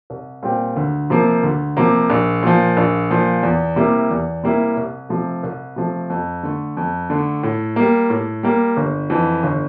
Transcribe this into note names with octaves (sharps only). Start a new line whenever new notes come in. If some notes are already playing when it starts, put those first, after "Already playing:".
C2
A#2 G3 C4 G4
D2
C3 F3 A#3
D2
C3 F3 A#3
A#1
A#2 F3
A#1
A#2 F3
E2
C3 G3 A#3 E4
E2
C3 G3 A#3 E4
C2
C3 F3 A3
C2
C3 F3 A3
F2
D3 A3
F2
D3 A3
A2
G3 A#3
A2
G3 A#3
G1
F2 E3
G1